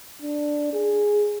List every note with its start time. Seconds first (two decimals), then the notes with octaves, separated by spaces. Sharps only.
0.22 D4
0.73 G#4